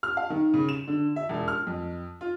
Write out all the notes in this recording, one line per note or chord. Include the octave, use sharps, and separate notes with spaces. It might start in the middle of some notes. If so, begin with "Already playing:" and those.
F6
F5
D#3
C#3
E7
D3
E5
E1
F6
F2
F4